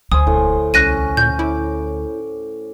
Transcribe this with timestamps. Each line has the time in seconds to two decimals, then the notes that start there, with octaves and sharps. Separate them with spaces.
0.12 D2 C5 G#5 D#6
0.27 E1 A2
0.74 C2 C#4 F#6 A#6 D#7
1.17 A#2 G6
1.39 E4 D6